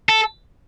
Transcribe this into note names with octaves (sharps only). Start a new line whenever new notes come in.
A4